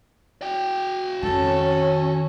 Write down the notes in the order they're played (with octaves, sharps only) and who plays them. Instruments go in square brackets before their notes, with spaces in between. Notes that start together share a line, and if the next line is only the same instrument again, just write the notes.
[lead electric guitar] F#4 G5
[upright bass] F2 D#3 [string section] C#4 [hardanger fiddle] A4